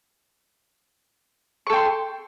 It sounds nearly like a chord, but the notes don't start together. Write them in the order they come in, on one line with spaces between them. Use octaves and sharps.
C#6 A4 G5 C6